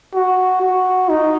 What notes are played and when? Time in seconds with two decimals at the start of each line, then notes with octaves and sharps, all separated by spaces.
0.14 F#4
0.61 F#4
1.09 D#4